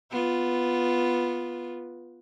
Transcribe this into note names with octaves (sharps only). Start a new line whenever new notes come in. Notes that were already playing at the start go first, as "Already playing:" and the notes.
B3 F4